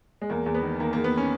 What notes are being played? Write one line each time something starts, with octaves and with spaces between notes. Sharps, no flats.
G#3
E2 A#3
E2
B3
D#3
D#3 A#3
E2 A#3
B3
C#4